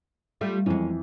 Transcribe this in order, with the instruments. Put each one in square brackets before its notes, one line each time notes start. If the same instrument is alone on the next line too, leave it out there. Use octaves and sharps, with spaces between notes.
[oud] G3 A3 F4
[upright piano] F2 E3 [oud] G#3 C#4